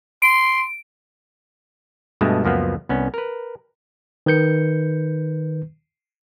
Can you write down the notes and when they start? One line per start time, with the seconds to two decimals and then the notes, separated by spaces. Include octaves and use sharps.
0.22 C6 D7
2.21 G2 B2 G#3 A3
2.44 C#2 F#2 F3 A#3 B3
2.89 C2 B3 C#4
3.14 A#4 B4
4.26 D#3 B4 G6 C#7